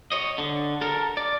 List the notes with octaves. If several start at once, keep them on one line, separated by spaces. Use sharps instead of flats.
C#5 D#5
D3
A4 A#4
D5